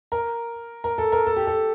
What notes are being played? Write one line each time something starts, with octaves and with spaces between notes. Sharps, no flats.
A#4
A#4
A4
A#4
A4
G4
A4